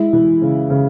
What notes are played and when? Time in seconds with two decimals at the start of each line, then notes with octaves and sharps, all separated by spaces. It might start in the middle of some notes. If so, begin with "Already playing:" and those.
Already playing: G#3 E4
0.13 E3
0.42 C#3
0.70 C#3